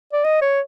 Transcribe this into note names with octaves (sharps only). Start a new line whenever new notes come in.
D5
D#5
C#5